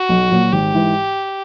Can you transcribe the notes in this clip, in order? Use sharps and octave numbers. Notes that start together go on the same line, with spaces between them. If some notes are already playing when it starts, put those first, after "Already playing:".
Already playing: F#4
B1
A#2 F#3
G#1 G4
G#2 E3